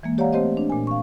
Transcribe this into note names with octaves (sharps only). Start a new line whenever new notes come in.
E3 G#3 A#3
G4 C#5 D5 F5 F#5 A#5
A3 C4 G4 C5 D#5
D4
A#2 G#5
F5 C#6